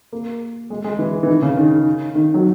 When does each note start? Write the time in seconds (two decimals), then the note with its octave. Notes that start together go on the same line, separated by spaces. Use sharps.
0.12 A#3
0.70 G#3
0.84 G#3
0.99 E3
1.23 E3
1.28 D#3
1.42 C#3
1.57 D#3
2.15 D#3
2.34 F#3